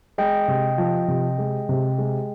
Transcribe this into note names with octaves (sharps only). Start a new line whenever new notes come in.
G#3 D#5 G5
C3
F3
C3
G#3
C3
G#3